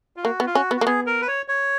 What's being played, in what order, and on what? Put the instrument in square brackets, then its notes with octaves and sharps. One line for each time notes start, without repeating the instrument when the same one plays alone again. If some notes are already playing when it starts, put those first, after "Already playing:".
[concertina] F4
[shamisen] A#3 [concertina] F#4
[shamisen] B3
[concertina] F4
[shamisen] C#4 [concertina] F#4
[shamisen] B3
[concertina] F#4
[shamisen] A#3
[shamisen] B3 [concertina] G#4
[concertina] A#4
B4
C#5
C#5